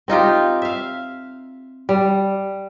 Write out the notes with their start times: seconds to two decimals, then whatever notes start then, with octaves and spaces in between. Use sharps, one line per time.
0.08 C4 D#4 F4 G4
0.62 E5 F5
1.89 G3